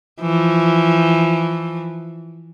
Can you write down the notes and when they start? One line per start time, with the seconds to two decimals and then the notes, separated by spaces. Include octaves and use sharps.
0.21 E3 F3